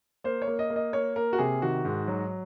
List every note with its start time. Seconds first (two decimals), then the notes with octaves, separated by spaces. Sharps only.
0.24 A#3 C5
0.42 C#5
0.47 A#3
0.59 D#5
0.70 A#3
0.76 D#5
0.93 A#3 C#5
1.16 A#3 A#4
1.33 F#4
1.38 C3 G#4
1.62 D#3 F#4
1.85 G#2
2.08 F#3